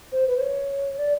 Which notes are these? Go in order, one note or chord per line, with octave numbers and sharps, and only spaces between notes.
C5
B4
C5
C#5
D5